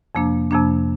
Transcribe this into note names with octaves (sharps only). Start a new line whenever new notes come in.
F2 C3 F3 A#3 D4
F2 C3 F3 A#3 D4